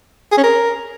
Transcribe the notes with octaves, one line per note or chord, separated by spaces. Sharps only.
G#4
C#4
A#4